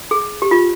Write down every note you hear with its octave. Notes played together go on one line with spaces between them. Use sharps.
G#4
G4
F4